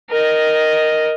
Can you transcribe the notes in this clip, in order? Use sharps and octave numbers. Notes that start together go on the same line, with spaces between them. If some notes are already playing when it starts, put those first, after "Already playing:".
A#4 D#5